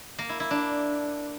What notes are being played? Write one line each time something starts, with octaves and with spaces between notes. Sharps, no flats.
A#3
E4
E4
D4